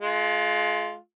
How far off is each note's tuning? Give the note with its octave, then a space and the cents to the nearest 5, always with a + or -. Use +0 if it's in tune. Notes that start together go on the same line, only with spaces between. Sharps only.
G#3 +35 F4 +0